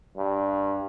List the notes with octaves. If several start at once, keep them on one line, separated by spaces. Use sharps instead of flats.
G2